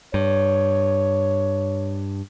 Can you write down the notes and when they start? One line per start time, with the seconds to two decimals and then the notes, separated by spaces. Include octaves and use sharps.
0.14 G2 C#5